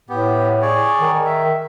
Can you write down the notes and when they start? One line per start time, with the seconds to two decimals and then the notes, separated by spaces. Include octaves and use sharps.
0.09 A2 B3 G4
0.62 G#4 C#5 D5
1.00 D#3
1.26 E5